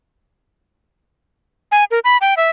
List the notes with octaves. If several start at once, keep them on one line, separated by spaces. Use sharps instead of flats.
G#5
A#4
B5
G5
E5